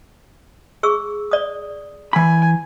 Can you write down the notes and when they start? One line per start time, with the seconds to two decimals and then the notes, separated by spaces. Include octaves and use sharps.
0.83 G#4 C#6 E6
1.31 D5 D#6
2.13 E3 G#5 B5